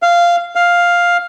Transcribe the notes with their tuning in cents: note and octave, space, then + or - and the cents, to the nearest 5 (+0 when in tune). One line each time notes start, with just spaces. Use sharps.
F5 -10
F5 +5